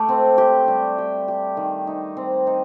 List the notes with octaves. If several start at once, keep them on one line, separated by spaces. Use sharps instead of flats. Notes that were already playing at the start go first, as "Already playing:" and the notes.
Already playing: A3 G4
C4
G4
G3
G4
G4
D#3
D#4
C4
D#4